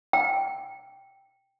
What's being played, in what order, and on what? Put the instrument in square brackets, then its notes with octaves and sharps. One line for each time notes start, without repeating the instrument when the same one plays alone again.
[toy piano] G5